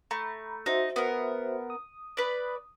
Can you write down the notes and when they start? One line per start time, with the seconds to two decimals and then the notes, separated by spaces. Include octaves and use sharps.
0.11 A3 A#5 B5
0.66 D#4 F#4 C5 E5
0.96 B3 A#4
1.70 D#6
2.17 B4 D5